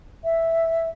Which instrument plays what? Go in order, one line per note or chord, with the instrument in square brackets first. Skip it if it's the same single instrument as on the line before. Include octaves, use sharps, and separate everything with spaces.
[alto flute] E5